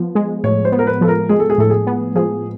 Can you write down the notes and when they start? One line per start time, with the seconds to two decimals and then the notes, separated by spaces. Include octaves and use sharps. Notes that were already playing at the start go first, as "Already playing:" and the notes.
Already playing: F3 B3
0.15 G#3
0.44 A2 C#5
0.65 C5
0.72 B3
0.79 A#4
0.87 B4
1.01 F3 A4
1.08 A#4
1.29 G#3 G#4
1.40 A4
1.50 G#4
1.58 A2 A4
1.70 G#4
1.87 B3
2.15 F3 G#4